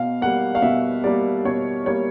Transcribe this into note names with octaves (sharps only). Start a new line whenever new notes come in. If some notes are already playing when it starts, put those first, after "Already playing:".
Already playing: B2 F5
G3 A#3 F#5
F5
B2 E5
G3 A#3 D5
B2 C#5
G3 A#3 C#5